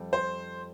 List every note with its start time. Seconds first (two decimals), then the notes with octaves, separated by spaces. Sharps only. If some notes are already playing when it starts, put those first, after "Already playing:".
Already playing: F2 G3
0.13 C5